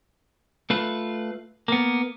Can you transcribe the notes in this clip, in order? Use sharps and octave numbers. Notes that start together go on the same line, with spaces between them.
A3 F4 B4
A#3 B3